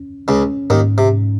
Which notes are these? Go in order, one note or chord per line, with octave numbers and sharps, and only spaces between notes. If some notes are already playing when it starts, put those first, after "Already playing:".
Already playing: C#4
C#2 C#3 C#4
D#2 G#2 D#3
C3
G#2